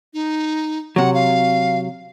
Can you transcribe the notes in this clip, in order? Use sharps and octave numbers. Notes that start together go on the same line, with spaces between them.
D#4
C3 F#3 F#5
F5